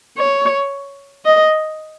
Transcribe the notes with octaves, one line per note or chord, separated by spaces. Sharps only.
C#5
D#5